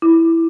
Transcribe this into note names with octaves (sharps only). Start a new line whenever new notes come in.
E4